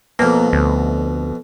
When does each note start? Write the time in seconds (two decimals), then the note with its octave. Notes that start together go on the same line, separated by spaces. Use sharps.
0.19 F2 B2 A#3
0.53 D2